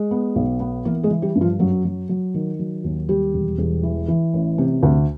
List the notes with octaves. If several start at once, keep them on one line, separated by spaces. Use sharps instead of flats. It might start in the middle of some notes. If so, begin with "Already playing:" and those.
Already playing: G#3
B3
B1
B3
E3 A#3 A#4
G#3 G#4
E3
G3 G4
G2
F3 F4
F#2 F#3 F#4
F#3
F#3
D#3
F#3
D#2
G3 G4
E1
E1
E3
E3
A1
C3
D2